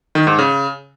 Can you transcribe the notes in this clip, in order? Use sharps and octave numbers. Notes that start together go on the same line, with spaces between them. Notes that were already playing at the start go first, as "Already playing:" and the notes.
D#3
G#2
C#3